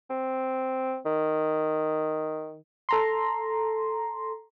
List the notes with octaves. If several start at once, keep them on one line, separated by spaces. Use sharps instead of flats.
C4
D#3
A4 A#5 C6